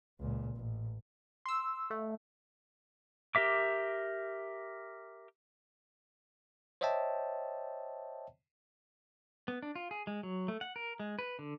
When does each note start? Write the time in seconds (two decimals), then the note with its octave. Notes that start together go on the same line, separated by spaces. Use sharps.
0.20 C#2 A#2
0.56 A1
1.46 C6 E6
1.90 A3
3.35 G4 A#4 E5 D6
6.81 C5 C#5 D#5 E5 G5 A5
9.48 B3
9.63 D4
9.75 F4
9.91 G#4
10.07 G#3
10.23 F#3
10.48 A3
10.61 F#5
10.76 A#4
11.00 G#3
11.19 B4
11.39 D3